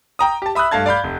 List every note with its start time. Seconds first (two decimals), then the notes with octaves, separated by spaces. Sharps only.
0.19 G5 A#5 D#6
0.42 G4 A5
0.55 E5 B5 D#6 E6 F#6
0.71 G2 A3 F5 A5 G#6
0.86 D5 F5 B5 G6
1.04 F1